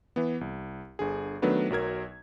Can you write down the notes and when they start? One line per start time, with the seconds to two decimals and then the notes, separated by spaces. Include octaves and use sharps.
0.16 E3 B3
0.41 C2
0.99 G1 D3 G#4
1.42 D#3 F#3 A3 B3 D4 B4
1.70 B1 F#3 A#4 G#6